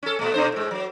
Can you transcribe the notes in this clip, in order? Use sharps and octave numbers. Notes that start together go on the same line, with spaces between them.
C#4 A4
A#2 A3
B2 D4 C5
A2 G#3
F#3